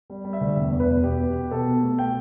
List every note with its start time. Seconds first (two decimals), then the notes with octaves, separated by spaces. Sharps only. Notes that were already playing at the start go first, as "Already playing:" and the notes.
0.10 G3
0.25 G3
0.33 E5
0.41 D2
0.56 E2 E5
0.72 E2
0.80 B4
0.89 B2
1.04 B2 G4
1.20 B3
1.36 B3
1.51 B2 A4
1.67 B2
1.83 A3
1.99 B2 G5